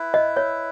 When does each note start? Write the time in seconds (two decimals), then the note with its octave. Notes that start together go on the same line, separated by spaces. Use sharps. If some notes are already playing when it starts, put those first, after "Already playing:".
Already playing: E4 B4 E5
0.14 D#5
0.37 C#5